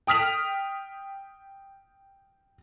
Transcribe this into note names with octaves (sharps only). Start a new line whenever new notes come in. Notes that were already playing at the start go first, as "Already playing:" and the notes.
G5 D#6 F6 B6 F7